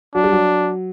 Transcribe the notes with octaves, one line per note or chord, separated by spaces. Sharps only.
F#3 D4
G3
F#3